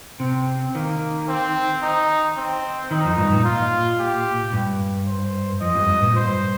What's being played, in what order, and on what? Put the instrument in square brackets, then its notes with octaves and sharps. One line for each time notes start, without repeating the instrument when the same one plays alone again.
[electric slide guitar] C3 [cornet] C4
[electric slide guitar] D#3 [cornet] A#3
[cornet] C4
D#4
C4
[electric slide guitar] D#3 [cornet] D#4
[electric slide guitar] F2
G2
A#2
[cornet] F4
G4
[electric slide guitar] G2
[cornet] C5
[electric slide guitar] F2 [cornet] D#5
[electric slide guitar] G2
G2
A#2
[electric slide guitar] G2 [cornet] C5